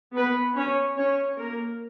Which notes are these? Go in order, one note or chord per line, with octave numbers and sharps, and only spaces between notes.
B3 B4
C#4 C#5
C#4 C#5
A#3 A#4